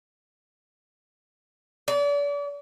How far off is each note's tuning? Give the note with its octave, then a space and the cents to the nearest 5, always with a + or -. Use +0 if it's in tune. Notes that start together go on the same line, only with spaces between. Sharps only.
D5 -35